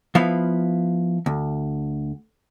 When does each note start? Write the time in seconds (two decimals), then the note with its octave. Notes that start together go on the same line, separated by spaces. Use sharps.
0.15 F3 B3 E4 F5
1.26 D2